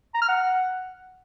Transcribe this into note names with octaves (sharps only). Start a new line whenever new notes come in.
A#5
F6
F#5